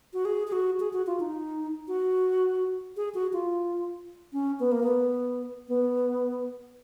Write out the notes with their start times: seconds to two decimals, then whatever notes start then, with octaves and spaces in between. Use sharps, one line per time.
0.14 F#4
0.25 G#4
0.47 G#4
0.52 F#4
0.80 G#4
0.93 F#4
1.07 F4
1.20 D#4
1.88 F#4
2.97 G#4
3.15 F#4
3.33 F4
4.33 C#4
4.60 B3
4.72 A#3
4.83 B3
5.68 B3